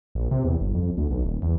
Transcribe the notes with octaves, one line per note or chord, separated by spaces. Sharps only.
A#1
C3
E2
G1
F2
D2
B1
D#1
E2